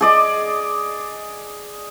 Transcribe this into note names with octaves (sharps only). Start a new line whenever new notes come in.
G#4 D5 D#5